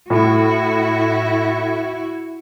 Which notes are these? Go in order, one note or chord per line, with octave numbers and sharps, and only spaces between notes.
A2 E4 F#4